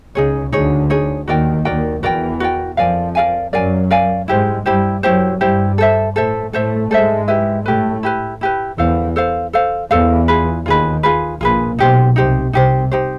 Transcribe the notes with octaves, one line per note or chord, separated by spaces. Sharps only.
C#2 C#3 D#4 G#4 C#5
D2 D3 D#4 G#4 C#5
D#4 G#4 C#5
D#2 D#3 F#4 A#4 D5 G5
D#2 D#3 F#4 A#4 D5 G5
E2 E3 F#4 A#4 D5 G5
F#4 A#4 D5 G5
F2 F3 A#4 D5 F5 G#5
A#4 D5 F5 G#5
F#2 F#3 A#4 D5 F5 G#5
A#4 D5 F5 G#5
G#2 G#3 E4 G4 C5
G2 G3 E4 G4 C5
F#2 F#3 E4 G4 C5
G2 G3 E4 G4 C5
A4 C5 E5
A2 A3 A4 C5 E5
A2 A3 A4 C5 E5
G#2 G#3 A4 C5 E5
E4 G4 B4
A2 A3 E4 G4 B4
E4 G4 B4
E4 G4 B4
E2 E3 A4 C5 F5
A4 C5 F5
A4 C5 F5
E2 E3 A4 C5 F5
F4 G#4 B4
D#2 D#3 F4 G#4 B4
F4 G#4 B4
A#1 A#2 F4 G#4 B4
B1 B2 D#4 G4 C5
C2 C3 D#4 G4 C5
C2 C3 D#4 G4 C5
D#4 G4 C5